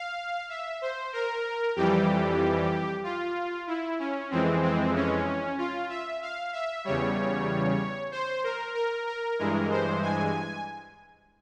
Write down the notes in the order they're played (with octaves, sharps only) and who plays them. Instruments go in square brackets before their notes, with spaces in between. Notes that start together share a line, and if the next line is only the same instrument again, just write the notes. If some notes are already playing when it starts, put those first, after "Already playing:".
Already playing: [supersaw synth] F5
E5
C5
A#4
F2 E3 G3 G4
F4
E4
C#4
F2 E3 G#3 C4
C4
C#4
F4
E5
F5
E5
E2 C#3 G3 C#5
C5
A#4
A#4
A#4
G2 E3 G#3 A#4
C5
G#5